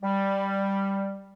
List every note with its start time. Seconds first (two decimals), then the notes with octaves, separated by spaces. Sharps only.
0.03 G3